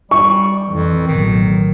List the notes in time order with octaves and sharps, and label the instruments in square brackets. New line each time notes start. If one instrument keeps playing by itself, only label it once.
[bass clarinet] G3 [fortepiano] C#6
[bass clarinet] F2 [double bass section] E3
[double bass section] A1 B2 F#3 [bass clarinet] D#3